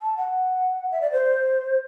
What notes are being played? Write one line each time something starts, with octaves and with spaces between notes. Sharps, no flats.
A5
F#5
E5
D5
C5